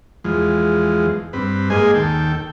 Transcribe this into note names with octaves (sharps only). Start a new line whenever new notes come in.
E2 F3 G#3
G2 C4 B4
G#2 A#3 G#4 D#5 G#5 C6
D#2 A4 G5